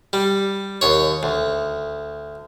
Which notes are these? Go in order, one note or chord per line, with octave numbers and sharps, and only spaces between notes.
G3
D#2 C#5
D2